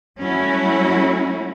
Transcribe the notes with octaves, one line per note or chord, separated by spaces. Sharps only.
F#3 G3 A3 C#4 E4 F#4